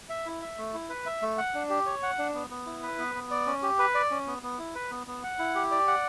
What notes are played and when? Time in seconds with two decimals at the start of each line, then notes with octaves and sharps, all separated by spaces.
0.10 E5
0.26 E4
0.42 E5
0.58 A3
0.74 E4
0.90 B4
1.06 E5
1.22 A3
1.38 F#5
1.54 D4
1.70 G4
1.86 C#5
2.03 F#5
2.18 D4
2.34 B3
2.50 B3
2.66 E4
2.83 B4
2.98 B3
3.15 B3
3.31 D5
3.47 C#4
3.62 G4
3.79 B4
3.95 D5
4.11 C#4
4.27 B3
4.43 B3
4.59 E4
4.75 B4
4.91 B3
5.07 B3
5.23 F#5
5.39 E4
5.55 G4
5.71 D5
5.87 F#5